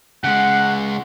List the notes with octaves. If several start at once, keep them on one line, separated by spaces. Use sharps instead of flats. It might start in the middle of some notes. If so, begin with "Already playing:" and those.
C#3 G#3 F#5